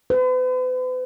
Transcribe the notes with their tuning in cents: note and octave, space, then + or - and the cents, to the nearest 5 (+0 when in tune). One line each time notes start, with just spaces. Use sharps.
B4 +45